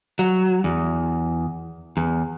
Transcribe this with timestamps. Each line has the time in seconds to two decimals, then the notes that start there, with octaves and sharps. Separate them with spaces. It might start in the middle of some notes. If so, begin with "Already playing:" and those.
0.19 F#3
0.64 E2
1.97 E2